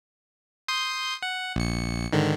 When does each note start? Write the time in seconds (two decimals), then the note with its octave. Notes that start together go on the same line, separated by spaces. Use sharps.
0.68 C6 D#6 G6
1.22 F#5
1.56 A#1 C#7
2.13 G#2 D3 D#3